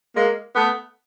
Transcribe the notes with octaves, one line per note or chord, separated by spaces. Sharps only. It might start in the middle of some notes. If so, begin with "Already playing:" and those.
G#3 A#3
A3 B3